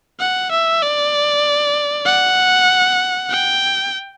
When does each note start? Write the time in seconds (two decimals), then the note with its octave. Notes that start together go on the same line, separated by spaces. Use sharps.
0.20 F#5
0.51 E5
0.82 D5
2.06 F#5
3.29 G5